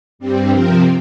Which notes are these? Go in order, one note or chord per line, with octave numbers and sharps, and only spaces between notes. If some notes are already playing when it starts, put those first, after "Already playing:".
G2 G3 C4 G4
C3 F3 C4 A#4